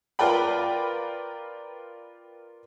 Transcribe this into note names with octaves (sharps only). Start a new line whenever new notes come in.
F4 A#4 B4 D5 G5 B5